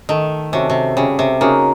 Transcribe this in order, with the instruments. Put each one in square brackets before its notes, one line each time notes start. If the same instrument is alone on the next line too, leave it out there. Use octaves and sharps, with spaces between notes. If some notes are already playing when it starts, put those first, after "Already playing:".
[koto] D#3 [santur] A3
[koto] C3 [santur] C#4 F#4 A4
[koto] C3
[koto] C#3 [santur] G3
[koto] C3
[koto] C#3 [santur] A#3 D#4 F#4